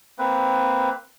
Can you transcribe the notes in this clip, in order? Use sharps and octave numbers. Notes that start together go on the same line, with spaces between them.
A#3 C4 B4